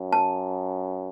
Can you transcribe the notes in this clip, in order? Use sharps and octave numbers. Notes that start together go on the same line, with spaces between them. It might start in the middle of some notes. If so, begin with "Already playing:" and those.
Already playing: F#2
A5